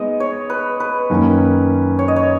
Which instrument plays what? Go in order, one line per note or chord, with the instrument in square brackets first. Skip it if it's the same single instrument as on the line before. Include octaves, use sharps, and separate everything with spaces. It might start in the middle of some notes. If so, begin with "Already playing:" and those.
Already playing: [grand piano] G#3 B3 D#4 [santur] D#5
[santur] C#5
B4
B4
[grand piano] F#2 D#3 A#3 C#4
[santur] C#5
D#5
C#5